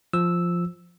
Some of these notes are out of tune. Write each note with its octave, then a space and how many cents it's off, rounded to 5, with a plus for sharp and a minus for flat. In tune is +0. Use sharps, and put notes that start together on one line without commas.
F3 +0 E6 -5